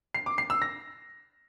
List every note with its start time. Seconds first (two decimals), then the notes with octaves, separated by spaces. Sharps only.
0.14 C7
0.26 D6
0.38 C7
0.50 E6
0.62 A#6